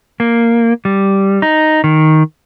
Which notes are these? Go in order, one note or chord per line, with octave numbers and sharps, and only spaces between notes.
A#3
G3
D#4
D#3